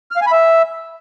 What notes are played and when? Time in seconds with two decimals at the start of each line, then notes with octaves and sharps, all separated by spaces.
0.11 F6
0.17 F5
0.22 G#5
0.27 B5
0.32 E5